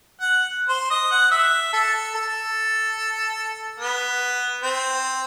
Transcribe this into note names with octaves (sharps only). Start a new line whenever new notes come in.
F#5
C5
D#5
F#5
E5
A4
A4
B3
C4